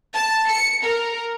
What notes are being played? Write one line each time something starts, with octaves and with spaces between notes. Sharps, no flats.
A5
C#7
A#4